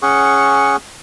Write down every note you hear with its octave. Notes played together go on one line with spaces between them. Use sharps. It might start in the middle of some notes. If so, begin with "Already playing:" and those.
C#4 G#4 F#5 C#6